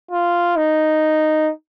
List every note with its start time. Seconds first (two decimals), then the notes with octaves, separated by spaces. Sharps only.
0.11 F4
0.56 D#4